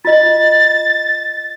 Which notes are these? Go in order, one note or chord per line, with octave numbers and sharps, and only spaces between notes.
F4 D#5 A6